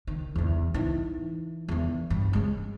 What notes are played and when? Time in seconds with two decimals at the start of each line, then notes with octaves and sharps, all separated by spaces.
0.07 D#3
0.35 E2 E3
0.74 E3 D#4
1.68 E2 D#3
2.10 G2
2.33 G#3 C#4